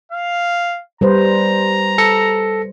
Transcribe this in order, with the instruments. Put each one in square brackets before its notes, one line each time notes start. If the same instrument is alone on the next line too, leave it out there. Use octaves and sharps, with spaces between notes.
[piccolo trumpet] F5
[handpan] G3 B4 C5 [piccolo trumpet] A#5
[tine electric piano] A4 A#6 C#7